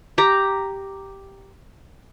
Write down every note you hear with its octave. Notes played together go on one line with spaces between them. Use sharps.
G4 A#5